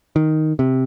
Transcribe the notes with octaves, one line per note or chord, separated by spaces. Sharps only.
D#3
C3